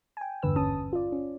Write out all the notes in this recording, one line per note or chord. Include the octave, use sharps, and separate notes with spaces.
G5 G#5
E2 G2 A#2 D3 B4 E6
G#1 C#4 A5 D#6
F4 D5
C#4